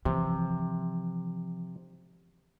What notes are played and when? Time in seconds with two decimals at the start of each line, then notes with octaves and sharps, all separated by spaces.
0.05 C3 E3 F3